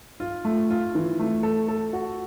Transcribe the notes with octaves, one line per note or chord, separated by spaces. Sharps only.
F4
A3
F4
E3
A3
A4
A4
F#4